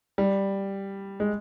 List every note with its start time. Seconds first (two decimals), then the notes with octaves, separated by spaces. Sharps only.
0.18 G3
1.20 G#3